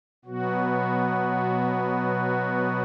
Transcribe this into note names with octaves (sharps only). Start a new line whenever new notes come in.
B2 F#3 B3 F#4